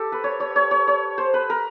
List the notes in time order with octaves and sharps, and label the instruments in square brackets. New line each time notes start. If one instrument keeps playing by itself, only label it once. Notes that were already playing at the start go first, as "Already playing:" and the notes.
Already playing: [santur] G4 A4
B4
C#5
C#5
C#5
C#5
C#5
C5
B4
A#4